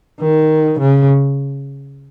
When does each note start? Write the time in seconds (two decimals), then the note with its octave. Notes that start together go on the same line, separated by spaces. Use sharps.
0.21 D#3
0.79 C#3